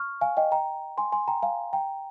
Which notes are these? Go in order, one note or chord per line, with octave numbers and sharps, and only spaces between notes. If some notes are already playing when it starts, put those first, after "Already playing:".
Already playing: C#6 F6
F5 G#5
D#5 G5
G5 A#5
G#5 C6
G#5 C6
G5 A#5
F5 G#5
G5 A#5